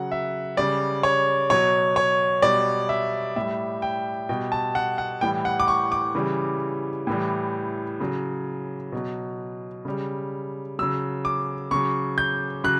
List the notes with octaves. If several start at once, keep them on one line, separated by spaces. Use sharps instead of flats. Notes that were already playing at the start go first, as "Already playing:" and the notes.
Already playing: C#3 F#3 F#5
E5
C#3 G3 D5
C#5
B2 F#3 C#5
C#5
B2 G3 D5
E5
A2 G3 E5
G5
B2 G3 G5
A5
F#5
F#5
A2 E3 G3 G5
F#5
D6
C#6
D6
C#3 E3 G3
A2 E3 G3
C#3 F#3
B2 F#3
C#3 G3
C#3 F#3 E6
D6
C#3 F#3 C#6
G6
C#3 F#3 F#6